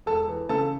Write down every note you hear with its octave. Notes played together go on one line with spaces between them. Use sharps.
E1 A4 A5
E3
C#3 A4 A5